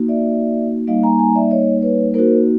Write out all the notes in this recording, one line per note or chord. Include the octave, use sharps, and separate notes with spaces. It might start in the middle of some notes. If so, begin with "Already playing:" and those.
Already playing: A#3 D#4 F#4
D5 E5
G3 A#3 D#4 D#5 F5
G#5 A#5
G#5 A#5
D5 E5
C#5 D#5
B4 C#5
A#3 D#4 F#4 A#4 C5